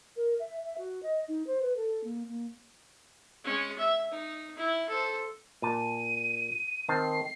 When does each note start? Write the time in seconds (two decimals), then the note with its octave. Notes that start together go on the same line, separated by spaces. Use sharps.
0.16 A#4
0.39 E5
0.64 E5
0.77 F#4
1.02 D#5
1.27 D#4
1.46 C5
1.61 B4
1.76 A4
2.03 A#3
2.28 A#3
3.44 G#3 C#4
3.78 E5
4.11 D#4
4.57 E4
4.89 A4 C5
5.62 A#2 A5 D#7
6.89 D#3 C4 A5 C7